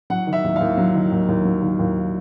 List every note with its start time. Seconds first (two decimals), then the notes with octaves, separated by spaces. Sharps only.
0.10 F#3 F#5
0.27 D#3
0.33 E5
0.44 D#2
0.56 D#2 F5
0.78 F#3
0.95 D#3
1.12 D#2
1.28 D#2
1.45 F#3
1.62 D#3
1.79 D#2